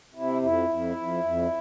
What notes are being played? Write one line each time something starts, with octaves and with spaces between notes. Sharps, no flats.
C3 E4
F2 E4
F2
F2
F2